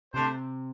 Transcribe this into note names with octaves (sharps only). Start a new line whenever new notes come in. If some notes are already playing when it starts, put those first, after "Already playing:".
C3 A3 D4 G4 C5